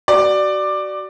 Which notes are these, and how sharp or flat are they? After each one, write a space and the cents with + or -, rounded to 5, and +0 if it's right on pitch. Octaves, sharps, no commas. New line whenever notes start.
F#4 +30 D5 +10